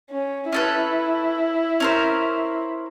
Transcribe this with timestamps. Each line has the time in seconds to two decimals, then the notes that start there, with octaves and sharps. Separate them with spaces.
0.11 C#4
0.53 C#4 E4 A4 B4
1.80 C#4 A#4 C5